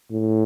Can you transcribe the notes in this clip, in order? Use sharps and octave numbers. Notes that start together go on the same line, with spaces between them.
A2